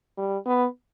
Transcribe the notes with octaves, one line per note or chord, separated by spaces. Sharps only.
G3
B3